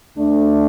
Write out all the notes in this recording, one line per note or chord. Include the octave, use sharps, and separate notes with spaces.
D2 D3 A3 D4